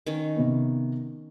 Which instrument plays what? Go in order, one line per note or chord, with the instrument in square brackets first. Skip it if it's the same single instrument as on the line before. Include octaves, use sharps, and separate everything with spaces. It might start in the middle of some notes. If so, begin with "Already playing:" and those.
[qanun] D#3 C#4
[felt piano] C3 B3